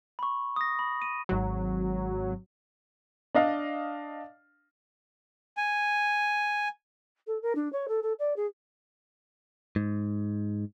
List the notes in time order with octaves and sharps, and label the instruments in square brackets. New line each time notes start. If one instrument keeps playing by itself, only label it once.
[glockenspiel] B5 C#6
D#6 A#6
B5
D#7
[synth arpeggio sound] G#1 F#3
[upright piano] D4 D#5 F5
[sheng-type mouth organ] G#5
[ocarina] A4
A#4
D4
C#5
A4
A4
D5
G#4
[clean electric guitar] G#2